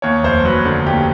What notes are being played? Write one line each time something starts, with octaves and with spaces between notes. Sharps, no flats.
D#2 C#5
F1 C5
F#3 B4
D3
D#2 G4